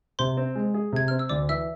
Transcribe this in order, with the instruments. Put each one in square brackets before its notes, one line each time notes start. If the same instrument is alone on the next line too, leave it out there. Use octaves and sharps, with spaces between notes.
[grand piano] C3 [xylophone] C5 C6
[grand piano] C4
G#3
G#4
[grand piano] C3 [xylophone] G#6
[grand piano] C4 [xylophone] F6
[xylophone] E6
[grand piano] D2 [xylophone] D5 D6
[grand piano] E3 [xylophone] E5 E6